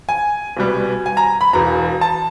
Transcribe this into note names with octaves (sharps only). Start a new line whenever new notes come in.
G#5
C2 B2 G3 B3
G#5
A#5
B5
E1 E2 B2 A#5
A5